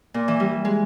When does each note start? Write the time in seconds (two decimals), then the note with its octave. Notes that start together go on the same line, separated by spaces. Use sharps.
0.14 A#2
0.28 E3
0.40 G3
0.65 G#3